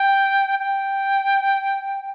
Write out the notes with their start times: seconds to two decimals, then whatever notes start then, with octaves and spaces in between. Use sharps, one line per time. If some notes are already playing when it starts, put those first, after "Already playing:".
Already playing: G5
0.59 G5